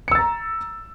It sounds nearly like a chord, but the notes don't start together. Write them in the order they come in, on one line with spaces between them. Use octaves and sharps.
C#7 E6 A6 A#5